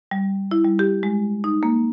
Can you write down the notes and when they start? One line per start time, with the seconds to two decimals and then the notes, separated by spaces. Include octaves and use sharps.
0.11 G3
0.51 E4
0.64 G3
0.79 G4
1.03 G#3
1.44 D#4
1.63 A#3